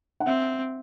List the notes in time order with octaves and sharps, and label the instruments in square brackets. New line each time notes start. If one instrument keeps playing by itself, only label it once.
[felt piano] F#5
[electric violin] C4 [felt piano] E5